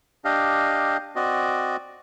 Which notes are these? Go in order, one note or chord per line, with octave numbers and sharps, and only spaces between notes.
D4 G4 D#5 F5
C4 F#4 D5 D#5